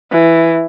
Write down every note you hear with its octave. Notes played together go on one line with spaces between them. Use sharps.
E3